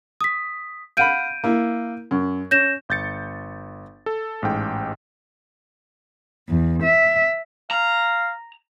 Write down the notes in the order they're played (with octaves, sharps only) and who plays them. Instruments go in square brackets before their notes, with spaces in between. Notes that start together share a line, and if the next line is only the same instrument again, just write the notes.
[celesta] D#6 B6
[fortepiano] F5 F#5 B5 [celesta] G6 D7 D#7
[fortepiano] A#3 E4
F#2
[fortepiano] C#4 [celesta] G6 A#6 E7
[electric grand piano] G1 G6 A6 C#7
A4
A1 G#2 G5
[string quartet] E2
E5
[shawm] F5 [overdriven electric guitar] A#5